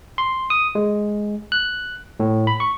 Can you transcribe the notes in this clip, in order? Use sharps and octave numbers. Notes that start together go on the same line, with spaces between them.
C6
D#6
G#3
F#6
A2
B5
C#6